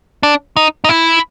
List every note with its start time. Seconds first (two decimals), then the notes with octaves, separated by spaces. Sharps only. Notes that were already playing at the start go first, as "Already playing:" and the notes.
0.23 D4
0.57 D#4
0.84 D#4
0.89 E4